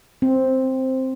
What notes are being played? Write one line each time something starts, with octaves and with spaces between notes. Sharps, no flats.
C4